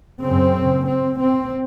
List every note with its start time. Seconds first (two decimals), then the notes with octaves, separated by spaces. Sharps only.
0.20 F#2 C#3 C4
0.87 C4
1.20 C4